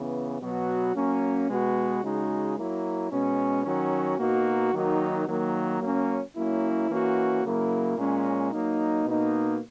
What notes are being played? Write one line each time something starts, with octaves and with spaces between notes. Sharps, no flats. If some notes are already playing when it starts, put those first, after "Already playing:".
Already playing: C#3 E3 B3
B2 F#3 B3 F#4
F#3 A#3 C#4
B2 G#3 B3 F#4
C#3 G#3 D#4 F#4
F#3 A#3 E4
B2 G#3 C#4
D#3 F#3 C#4 F#4
B2 A#3 D#4 F#4
D#3 F#3 A#3 D#4 F#4
D#3 F#3 A#3
F#3 A#3 C#4
F#3 A#3 C#4 E4
E3 A#3 C#4 F#4
C#3 F#3 A#3 E4
A#2 G#3 C#4
F#3 A#3 D#4
B2 A#3 D#4